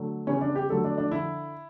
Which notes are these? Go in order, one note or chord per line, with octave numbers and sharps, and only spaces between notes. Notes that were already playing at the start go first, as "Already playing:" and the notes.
Already playing: D3 F#3 A3
C#3 E3 G3 B3 C#4
D4
G4
D3 F#3 A3 A4
D4
D4
D3 E4